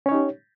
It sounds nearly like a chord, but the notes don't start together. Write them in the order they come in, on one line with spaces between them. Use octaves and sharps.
C#4 C#5 D#4 G4